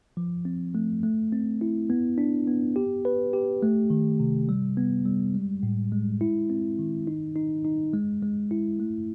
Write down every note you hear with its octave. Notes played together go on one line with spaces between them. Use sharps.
F3
C4
A3
A3
C4
E4
B3
D4
B3
G4
B4
G4
A3
D#3
C3
G3
B3
G3
G#3
A2
G#3
E4
C4
D#3
D#4
D#4
D#4
G#3
G#3
E4
A3